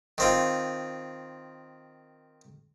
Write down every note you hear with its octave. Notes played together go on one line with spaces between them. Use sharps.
D#3 C4 F4